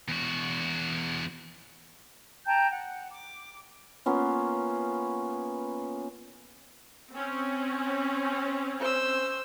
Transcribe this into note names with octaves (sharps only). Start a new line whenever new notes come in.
E2 F#4
G5 A5 A#5 G6
F#5
D6
A#3 B3 C#4 F4
C4 C#4
C5 E6